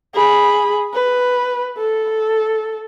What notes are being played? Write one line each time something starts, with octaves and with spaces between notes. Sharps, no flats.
G#4 B5
B4
A4